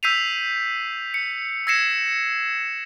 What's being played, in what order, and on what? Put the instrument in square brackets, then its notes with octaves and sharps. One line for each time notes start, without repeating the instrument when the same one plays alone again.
[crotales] E6 G6 B6 C7 D#7 F7
C#7
E6 G#6 A#6 C7 C#7 E7